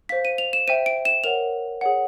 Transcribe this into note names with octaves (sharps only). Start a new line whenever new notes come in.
C5 F5 B6
D#7
F7
E7
C5 E5 G5 D#7
D7
E7
A#4 C#5 F#5 F7
G#4 C#5 F#5